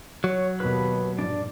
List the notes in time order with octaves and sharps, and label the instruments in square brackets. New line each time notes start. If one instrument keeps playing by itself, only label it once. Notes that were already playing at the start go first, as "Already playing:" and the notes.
[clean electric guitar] F#3 [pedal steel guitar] C#5
[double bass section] D#2 B2 [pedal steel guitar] B4 B5
[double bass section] A#1 G2 [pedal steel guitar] D4 D5